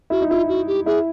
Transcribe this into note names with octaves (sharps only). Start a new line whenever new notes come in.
E4 F#4
D#4
E4 F4
F#4
G4
E4 G#4